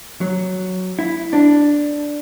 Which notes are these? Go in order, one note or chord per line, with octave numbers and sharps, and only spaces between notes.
F#3
E4
D4